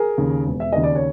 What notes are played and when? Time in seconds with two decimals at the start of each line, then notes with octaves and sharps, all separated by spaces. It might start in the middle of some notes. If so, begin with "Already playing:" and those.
Already playing: G#4 A#4
0.18 D#2 C#3
0.47 E1
0.60 E5
0.72 D#2 C#3 D#5
0.83 D5
0.95 C#5